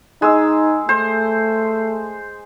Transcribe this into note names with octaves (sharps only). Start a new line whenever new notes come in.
G#3 D#4 E6
A3 C5